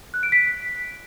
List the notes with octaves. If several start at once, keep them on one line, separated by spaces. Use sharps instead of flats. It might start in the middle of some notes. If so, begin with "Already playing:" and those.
F#6
D7
B6